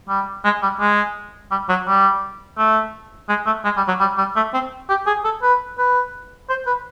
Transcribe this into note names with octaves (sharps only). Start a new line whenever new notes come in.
G3
G#3
G3
G#3
G3
F#3
G3
A3
G#3
A3
G#3
G3
F#3
G3
G3
A3
C4
G4
G#4
A4
B4
B4
C5
B4